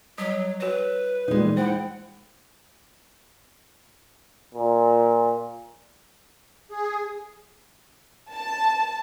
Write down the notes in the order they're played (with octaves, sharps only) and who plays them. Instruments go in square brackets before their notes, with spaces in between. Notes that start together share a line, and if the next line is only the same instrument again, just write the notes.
[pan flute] F#3 [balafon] G3
[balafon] F#4 C#5 [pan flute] B4
[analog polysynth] E2 A#2 G3 [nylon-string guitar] G#3 D#4
[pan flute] E4 [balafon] C5 [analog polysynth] F#5 G5
[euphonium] A#2
[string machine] G#4
[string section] A5